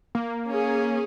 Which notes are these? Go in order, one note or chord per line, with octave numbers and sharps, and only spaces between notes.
A#3
C#4 G#4